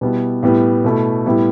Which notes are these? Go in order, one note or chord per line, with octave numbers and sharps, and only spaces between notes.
B2 G3 B3 E4
A2 G3 B3 E4
B2 A3 E4
A2 G3 B3 E4